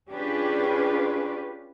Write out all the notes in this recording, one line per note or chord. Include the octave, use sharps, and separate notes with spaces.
C#4 D4 F4 G4 G#4 B4